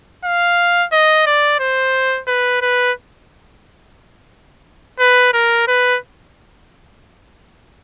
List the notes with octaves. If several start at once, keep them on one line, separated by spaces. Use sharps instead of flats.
F5
D#5
D5
C5
B4
B4
B4
A#4
B4